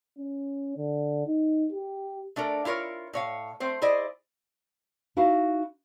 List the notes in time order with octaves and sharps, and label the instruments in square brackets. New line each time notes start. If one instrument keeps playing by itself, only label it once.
[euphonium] C#4
D3
D#4
G4
[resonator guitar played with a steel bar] A3 D4 A4 A#4
E4 F4 A#4 C#5
A2 C#5 F5
A3 C4 C5
E4 G#4 C5 D5 D#5
[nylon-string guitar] D#4 E4 F#4 F5